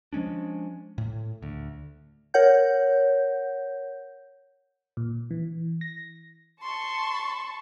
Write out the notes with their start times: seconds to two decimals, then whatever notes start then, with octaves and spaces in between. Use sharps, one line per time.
0.13 F3 G#3 C#4 D4
0.98 A2
1.42 D2
2.34 A#4 C#5 F#5 G6
4.97 A#2
5.31 E3
5.81 A#6
6.63 A5 C6 C#6